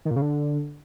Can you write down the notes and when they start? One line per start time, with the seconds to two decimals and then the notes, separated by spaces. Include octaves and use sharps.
0.05 D#3
0.11 A#2
0.16 C#3
0.22 D3